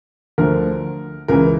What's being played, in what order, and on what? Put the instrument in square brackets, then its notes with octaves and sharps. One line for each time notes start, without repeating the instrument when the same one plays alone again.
[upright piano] D2 D3 F3 A#4
C#2 C#3 E3 A#4